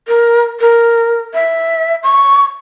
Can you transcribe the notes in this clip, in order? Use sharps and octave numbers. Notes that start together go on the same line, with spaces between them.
A#4
A#4
E5
C#6